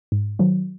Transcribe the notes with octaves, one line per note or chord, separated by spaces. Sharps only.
G#2
D#3 F#3